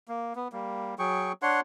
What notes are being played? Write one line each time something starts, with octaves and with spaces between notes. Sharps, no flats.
A#3
B3
G3 A#3
F#3 G#4 G5 C#6
D4 C#5 F#5 C6